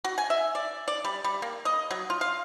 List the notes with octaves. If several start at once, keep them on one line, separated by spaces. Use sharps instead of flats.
F#4
G#5
E5
D5
D5
G3
G3
A#3
D#5
F#3
F4
F5